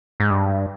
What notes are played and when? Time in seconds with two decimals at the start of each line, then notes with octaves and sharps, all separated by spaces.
0.20 G#2
0.30 G2